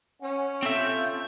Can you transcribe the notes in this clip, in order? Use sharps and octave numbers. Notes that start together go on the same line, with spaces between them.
C#4 F#5 G#5
C4 F4 A4 E5 G6